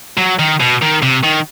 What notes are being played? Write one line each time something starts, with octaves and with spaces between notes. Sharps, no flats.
F#3
D#3
B2
D#3
C3
D#3